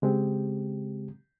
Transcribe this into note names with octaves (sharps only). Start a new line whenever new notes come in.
C#3 G#3 C4 G4